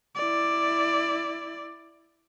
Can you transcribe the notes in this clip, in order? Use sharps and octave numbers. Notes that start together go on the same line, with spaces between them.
E4 D5